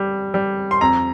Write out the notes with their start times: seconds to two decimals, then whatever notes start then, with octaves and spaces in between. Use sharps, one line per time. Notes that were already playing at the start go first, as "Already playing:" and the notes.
Already playing: G3
0.34 G3
0.71 C6
0.81 F2 A#5